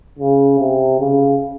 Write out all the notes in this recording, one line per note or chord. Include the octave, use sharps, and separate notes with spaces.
C#3
C3
C#3